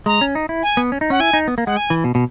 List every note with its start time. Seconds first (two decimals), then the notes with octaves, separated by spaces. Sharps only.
0.06 G#3 A#5
0.21 C#4
0.35 D#4
0.49 E4
0.63 G#5
0.77 B3
0.92 C#4
1.01 D#4
1.10 C#4 F#5
1.20 E4 G#5
1.33 D#4
1.48 B3
1.58 A#3
1.66 G#3 F#5
1.77 G#5
1.90 E3
2.04 B2
2.15 B2